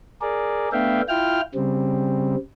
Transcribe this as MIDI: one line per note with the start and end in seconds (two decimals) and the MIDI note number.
0.21 0.69 68
0.21 0.69 70
0.21 0.69 74
0.73 1.01 57
0.73 1.01 59
0.73 1.01 62
0.73 1.01 76
0.73 1.01 77
0.73 1.01 79
1.09 1.41 64
1.09 1.41 65
1.09 1.41 79
1.09 1.41 89
1.55 2.36 49
1.55 2.36 55
1.55 2.36 60